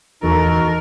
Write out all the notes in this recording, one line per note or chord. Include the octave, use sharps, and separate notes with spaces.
D1 E2 E3 D#4 F#4 A4 A#4